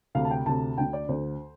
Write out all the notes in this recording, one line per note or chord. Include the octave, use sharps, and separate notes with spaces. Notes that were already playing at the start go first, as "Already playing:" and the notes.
D2 C3 F5
A5
G5
D2 C3 A5
D2 D3 G5
D5
D2 D3 C5